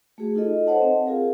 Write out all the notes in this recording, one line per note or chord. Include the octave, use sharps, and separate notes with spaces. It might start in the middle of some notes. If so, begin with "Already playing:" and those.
A3 F#4 G#4
D#4 F4 A4 D#5
A4 C5 C#5 D#5 F#5 A5
C4
F4 G#4 A#4 F5